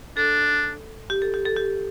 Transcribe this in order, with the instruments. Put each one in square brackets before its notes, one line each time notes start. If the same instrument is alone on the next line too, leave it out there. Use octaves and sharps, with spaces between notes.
[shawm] D4 [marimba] A4
[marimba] G4
A4
G4
A4
G4